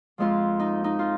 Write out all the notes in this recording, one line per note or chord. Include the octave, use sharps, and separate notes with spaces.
F2 F3 G#3 F4
D#4
D#4
F4